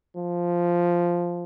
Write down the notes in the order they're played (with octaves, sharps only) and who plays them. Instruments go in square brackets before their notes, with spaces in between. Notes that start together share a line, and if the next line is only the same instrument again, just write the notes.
[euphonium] F3